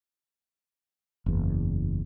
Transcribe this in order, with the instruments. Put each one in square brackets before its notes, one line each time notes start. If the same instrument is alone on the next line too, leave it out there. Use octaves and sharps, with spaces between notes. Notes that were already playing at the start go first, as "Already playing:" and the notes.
[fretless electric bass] F#1 E2